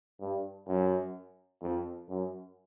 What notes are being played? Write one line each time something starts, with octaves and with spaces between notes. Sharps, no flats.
G2
F#2
F2
F#2